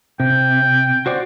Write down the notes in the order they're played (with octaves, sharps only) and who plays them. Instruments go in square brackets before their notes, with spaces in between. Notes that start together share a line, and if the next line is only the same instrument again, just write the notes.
[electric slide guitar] C3 [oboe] G5
[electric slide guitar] F#4 C5 D5